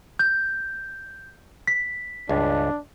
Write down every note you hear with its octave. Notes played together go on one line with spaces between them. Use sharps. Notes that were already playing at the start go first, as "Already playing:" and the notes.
G6
B6
C#2 G2 D4